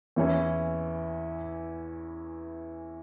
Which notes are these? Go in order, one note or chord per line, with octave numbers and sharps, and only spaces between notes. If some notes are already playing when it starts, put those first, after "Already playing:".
E2 E3 C#4 E4